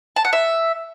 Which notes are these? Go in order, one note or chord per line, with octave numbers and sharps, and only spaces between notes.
A5
F#5
E5